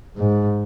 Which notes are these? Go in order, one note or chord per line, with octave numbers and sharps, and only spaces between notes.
G#2